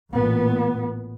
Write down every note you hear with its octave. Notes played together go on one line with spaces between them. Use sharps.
A1 A#2 B3